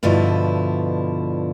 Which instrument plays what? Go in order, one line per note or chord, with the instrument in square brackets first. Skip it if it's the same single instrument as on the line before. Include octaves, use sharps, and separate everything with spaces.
[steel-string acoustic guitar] G2 B2 D3 F3 E4 F4